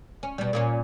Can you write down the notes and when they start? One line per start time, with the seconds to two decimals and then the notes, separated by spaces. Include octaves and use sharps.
0.23 C#4
0.38 B2 G3
0.53 A#2 A#3 C#4